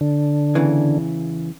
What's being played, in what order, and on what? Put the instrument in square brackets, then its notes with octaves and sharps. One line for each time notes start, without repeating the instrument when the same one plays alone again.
[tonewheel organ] D3
[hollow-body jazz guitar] E2 C#3 E3